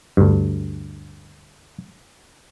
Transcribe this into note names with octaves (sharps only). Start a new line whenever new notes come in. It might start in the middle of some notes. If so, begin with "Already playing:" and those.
D2 G2